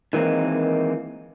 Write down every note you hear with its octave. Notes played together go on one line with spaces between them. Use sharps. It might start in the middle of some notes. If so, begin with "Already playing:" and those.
D#3 E3 G#3 A#3 C4